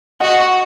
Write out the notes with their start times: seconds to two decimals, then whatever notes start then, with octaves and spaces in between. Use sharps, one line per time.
0.20 F#4 D#5 F#5